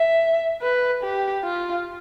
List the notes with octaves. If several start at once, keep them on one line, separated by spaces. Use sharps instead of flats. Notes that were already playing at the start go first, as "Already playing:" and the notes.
Already playing: E5
B4
G4
F4